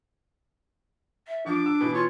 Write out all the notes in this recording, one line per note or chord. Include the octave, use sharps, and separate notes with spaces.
E5
F3 D4 D6
E6
B2 E3
F4 C#5